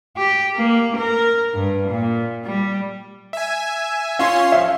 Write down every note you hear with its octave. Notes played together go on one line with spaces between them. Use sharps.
G4
A#3
A#4
G2
A#2
G3
E5 G#5
C#4 F4 C#5 C6
F3 E5 F5